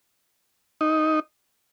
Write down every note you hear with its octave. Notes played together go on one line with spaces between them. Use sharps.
D#4